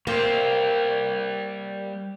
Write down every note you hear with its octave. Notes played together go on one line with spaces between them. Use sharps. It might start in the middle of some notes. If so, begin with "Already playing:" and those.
G3 A#3 G4 C5